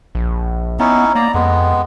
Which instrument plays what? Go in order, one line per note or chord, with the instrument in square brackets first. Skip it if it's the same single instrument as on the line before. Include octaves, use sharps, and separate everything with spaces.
[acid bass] A#1
[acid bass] B3 [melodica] C#4 D#4 E4
[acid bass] A#3 [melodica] D5 A#5
[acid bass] F2 [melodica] G#3 B3